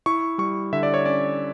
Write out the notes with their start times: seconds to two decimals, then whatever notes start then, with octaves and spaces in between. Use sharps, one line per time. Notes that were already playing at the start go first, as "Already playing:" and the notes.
0.06 E4 C#6
0.38 G3 C#6
0.73 D3 E5
0.83 D5
0.94 C#5
1.05 C#4 D5